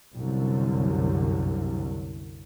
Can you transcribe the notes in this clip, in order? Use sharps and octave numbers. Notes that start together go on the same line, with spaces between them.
C2 F#2 D3